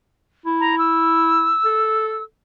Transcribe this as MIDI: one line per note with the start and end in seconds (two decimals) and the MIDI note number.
0.46 1.53 64
0.60 0.76 82
0.79 2.24 88
1.65 2.22 69